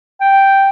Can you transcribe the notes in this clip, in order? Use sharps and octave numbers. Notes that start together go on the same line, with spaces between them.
G5